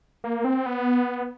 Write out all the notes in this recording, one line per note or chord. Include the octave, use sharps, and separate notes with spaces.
A#3
C4
B3